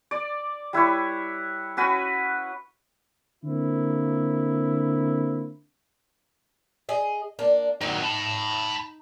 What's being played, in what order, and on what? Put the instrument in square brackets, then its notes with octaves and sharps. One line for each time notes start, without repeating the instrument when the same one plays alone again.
[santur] D5
G3 E4 B4 C#5
C#4 F#4 B4
[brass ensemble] D3 A#3 C4 E4
[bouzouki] G#4 D#5
A#3 D4
[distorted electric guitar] D#3 F#3 [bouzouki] D#4
[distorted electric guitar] A5 B5